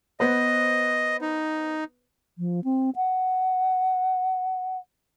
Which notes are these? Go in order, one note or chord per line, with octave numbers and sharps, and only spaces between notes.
B3 B4 C5 D#5
D#4
F3
C4
F#5